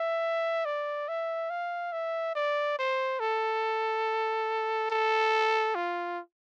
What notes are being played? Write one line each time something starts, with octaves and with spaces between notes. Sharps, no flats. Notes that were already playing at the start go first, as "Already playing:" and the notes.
Already playing: E5
D5
E5
F5
E5
D5
C5
A4
A4
F4